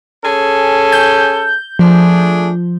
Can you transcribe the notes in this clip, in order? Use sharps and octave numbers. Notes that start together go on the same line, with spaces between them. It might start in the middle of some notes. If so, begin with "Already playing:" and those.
C#4 G#4 A4
G6
F3 A3 D4 G#4